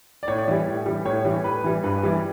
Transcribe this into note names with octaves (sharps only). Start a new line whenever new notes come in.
D5
A2 C#5
E3 G3
A2
E3 G3
A2 C#5
E3 G3
A2 B4
E3 G3
G2 B4
E3 G3